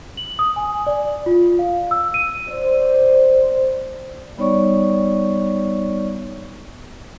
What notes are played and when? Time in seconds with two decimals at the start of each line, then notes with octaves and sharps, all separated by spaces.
0.17 F#7
0.39 D#6
0.56 G#5
0.87 D5
1.26 F4
1.59 F5
1.91 E6
2.14 D#7
2.49 C5 D5
4.38 G3 B3 D#4 C#5 D5 C#6